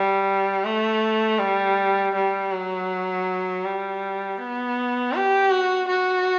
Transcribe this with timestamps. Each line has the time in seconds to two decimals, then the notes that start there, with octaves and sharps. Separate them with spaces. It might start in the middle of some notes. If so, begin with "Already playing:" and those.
Already playing: G3
0.64 A3
1.39 G3
2.15 G3
2.52 F#3
3.64 G3
4.38 B3
5.14 G4
5.51 F#4
5.88 F#4